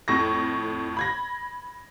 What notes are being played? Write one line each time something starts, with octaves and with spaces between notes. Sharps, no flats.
F2 A2 C#6 A#6
B5 G#6 A#6